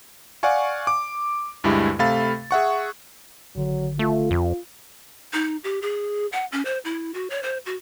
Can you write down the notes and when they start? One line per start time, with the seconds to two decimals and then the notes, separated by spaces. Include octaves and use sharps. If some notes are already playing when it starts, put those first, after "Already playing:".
0.43 D5 F5 F#5 G#5 C#6
0.87 D6
1.64 D2 G2 G#3 E4 G4
1.99 C3 A3 A4 F5 B5 A6
2.51 G#4 E5 F#5 C#6
3.55 A1 D3 F#3
3.99 A3 F4
4.31 F2
5.33 D#4
5.64 G4
5.82 G#4
6.32 F#5
6.52 C#4
6.65 C5
6.85 E4
7.14 F#4
7.30 C#5
7.43 C5
7.66 F#4